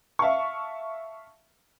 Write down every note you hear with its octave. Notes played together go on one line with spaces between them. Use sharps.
E5 F5 A5 C#6